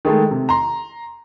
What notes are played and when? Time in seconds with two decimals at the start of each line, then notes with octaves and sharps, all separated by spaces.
0.05 D#3 G#3 A3 A4
0.31 C3
0.49 A#5 C6